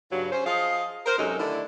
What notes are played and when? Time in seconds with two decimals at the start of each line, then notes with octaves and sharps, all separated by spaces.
0.12 G2 C#3 F#3
0.32 C#4 C5
0.46 F3 G#4 D#5 F5
1.06 A#4 C5
1.18 F#2 C3 F#3 G#3 D#4 A4
1.39 D3 D#3 A3 D4 E4